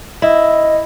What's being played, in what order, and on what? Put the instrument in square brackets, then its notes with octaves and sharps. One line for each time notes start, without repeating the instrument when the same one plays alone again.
[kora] E4 [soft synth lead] D#5